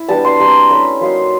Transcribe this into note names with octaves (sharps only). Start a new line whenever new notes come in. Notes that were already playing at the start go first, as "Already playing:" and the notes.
Already playing: E4
G3 B3 D4 A5
C6
G3 C4 E4 A#5
A3 C#4 E4 B5
F#3 A#3 D#4 C6